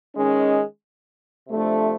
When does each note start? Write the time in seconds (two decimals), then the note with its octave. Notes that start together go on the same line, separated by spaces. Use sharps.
0.13 D#3 G#3 C#4
1.48 C3 F3 A3 D4